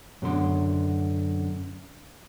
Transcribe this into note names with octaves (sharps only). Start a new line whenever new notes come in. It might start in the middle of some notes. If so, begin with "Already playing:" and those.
F#2 B2 D3 C6